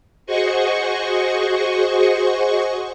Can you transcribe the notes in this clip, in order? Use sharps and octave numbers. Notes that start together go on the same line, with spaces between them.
F#4 G#4 C5 D#5 C#6